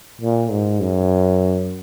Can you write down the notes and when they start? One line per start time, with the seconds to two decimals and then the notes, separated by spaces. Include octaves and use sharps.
0.21 A#2
0.51 G#2
0.81 F#2